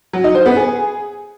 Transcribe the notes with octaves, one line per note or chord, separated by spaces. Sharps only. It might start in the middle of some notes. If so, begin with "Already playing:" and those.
F#3
D#4
C5
B3
G#4